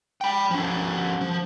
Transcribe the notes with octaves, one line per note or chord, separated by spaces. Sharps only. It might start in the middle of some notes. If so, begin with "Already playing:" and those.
G5 B5
F3 C#4
F3